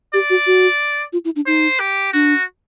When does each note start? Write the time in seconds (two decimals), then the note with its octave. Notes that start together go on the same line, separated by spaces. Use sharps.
0.14 G4 D5
0.30 F#4
0.47 F#4
1.13 F4
1.25 E4
1.36 D4
1.46 D#4 C5
1.79 G4
2.13 D4 F#4